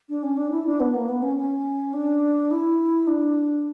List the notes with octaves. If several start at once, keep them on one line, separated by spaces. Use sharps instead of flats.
D4
C#4
D4
E4
D4
B3
A#3
B3
C#4
C#4
D4
E4
D4